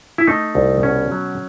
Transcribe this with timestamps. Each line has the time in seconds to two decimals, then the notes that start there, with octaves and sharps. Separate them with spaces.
0.18 E4
0.27 A3 D#4
0.55 C2
0.83 B2 C#4
1.12 F#3